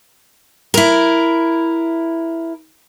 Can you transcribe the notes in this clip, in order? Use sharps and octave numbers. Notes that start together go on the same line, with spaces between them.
E4 A#4